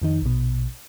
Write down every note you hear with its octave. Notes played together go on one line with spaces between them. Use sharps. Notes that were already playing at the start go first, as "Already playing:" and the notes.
F2 D#3 D#4
A#1 B2